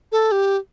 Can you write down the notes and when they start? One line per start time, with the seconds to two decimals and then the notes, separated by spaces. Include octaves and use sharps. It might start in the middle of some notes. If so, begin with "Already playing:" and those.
0.12 A4
0.32 G4